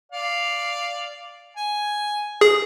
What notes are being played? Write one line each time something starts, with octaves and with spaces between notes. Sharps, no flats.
D5 F5
G#5
G#4